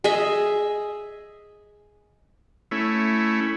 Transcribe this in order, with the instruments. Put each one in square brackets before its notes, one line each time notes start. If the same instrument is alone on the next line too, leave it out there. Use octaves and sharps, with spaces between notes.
[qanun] G#4 D#5 E5
[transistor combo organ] A3 C#4 E4